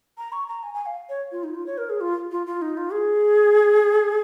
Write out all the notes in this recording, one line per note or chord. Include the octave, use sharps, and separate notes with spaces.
A#5
C#6
A#5
G#5
G#5
F5
C#5
F4
D#4
F4
C#5
A#4
G#4
F4
F4
F4
D#4
F4
G#4